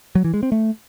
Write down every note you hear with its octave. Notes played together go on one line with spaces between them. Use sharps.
F#3
E3
G#3
C4
A3